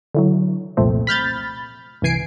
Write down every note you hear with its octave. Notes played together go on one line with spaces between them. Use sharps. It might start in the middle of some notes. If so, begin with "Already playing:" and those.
D3 E3 F#3
C2 F2 A#2 A3 C4
B5 F6 G6 A6
G1 C2 E3 G#5 C7 D7